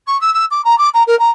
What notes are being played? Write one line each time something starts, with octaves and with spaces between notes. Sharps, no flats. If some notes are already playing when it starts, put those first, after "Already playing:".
C#6
E6
E6
D6
A#5
D6
A#5
A#4
A#5